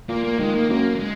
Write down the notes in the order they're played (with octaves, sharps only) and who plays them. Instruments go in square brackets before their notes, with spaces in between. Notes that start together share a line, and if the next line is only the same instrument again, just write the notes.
[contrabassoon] A#2 [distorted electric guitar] A#3
[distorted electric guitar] A#3
[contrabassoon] D#3 [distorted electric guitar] G#3
[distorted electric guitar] A#3
[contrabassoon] F#2 [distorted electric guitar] A#3
[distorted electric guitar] A#3
G#3